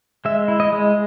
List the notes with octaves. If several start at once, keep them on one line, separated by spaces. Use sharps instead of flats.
G#3 E5
E4
D#5
G#3